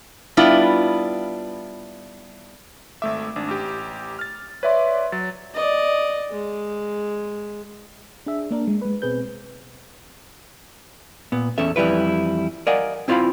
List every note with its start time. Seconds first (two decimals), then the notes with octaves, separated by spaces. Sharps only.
0.37 G3 B3 D4 E4 F4
3.02 G#1 A3 E5 D6
3.36 G#1 D4
3.48 A1 G4
4.19 F6 A6
4.63 B4 C#5 D5 E5 C6
5.12 F#3 A6
5.54 D5 D#5
6.31 G#3
8.26 D4 G#4 E5
8.51 A#3 D4 A#4
8.67 G#3
8.82 G#3 B4
9.02 B2 C4 G#4 B4 G6
11.32 A#2 B3
11.58 E2 C#4 A4 E5
11.76 F2 E3 G3 E4 B4
12.67 A#4 D5 D#5 F5 F#5 G#5
13.08 C4 E4 F4 C5 F5 B5